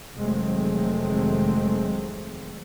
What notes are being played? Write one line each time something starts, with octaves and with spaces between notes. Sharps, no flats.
F1 D#3 F#3 G#3 A3 C4